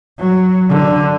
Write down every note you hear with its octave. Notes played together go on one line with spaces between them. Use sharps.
F#3
D3